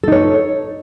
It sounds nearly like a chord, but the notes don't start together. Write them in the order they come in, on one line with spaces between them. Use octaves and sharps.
A4 D#4 C#5